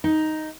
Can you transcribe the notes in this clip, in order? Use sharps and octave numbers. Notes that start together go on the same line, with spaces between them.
D#4